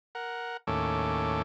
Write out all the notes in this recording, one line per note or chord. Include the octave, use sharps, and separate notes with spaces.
A#4 F#5
D#2 A2 C#4 A4 D6